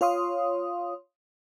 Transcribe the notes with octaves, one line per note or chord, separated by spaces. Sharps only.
F4 C#5 F5 C6 D#6